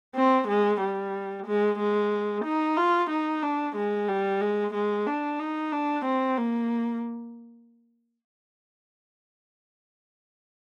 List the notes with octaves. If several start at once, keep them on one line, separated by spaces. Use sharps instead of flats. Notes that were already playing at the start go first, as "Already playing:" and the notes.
C4
G#3
G3
G#3
G#3
D#4
F4
D#4
D4
G#3
G3
G#3
G#3
D4
D#4
D4
C4
A#3